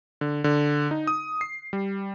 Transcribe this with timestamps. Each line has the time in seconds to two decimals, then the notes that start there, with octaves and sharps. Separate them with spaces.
0.21 D3
0.44 D3
0.91 D#4
1.07 D#6
1.41 C7
1.73 G3